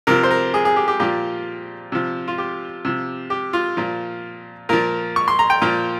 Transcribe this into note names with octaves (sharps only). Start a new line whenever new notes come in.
C3 F3 A#4
C5
A#4
G#4
G#4
G4
G4
A#2 F3 G4
C3 F3
F4
G4
C3 F3
G4
F4
A#2 F3
A#2 F3 A#4
C#6
C6
A#5
G5
A#2 F3